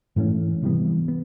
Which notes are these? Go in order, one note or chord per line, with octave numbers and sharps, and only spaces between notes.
G#2 E3 A3 C#4
C3 E3 G3 B3
B3